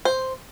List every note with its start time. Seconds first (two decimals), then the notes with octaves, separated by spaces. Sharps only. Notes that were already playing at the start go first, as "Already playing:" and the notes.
0.05 C5